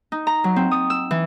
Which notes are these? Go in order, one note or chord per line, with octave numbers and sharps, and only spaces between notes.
D#4
A#5
F#3
C4
D#6
E6
E3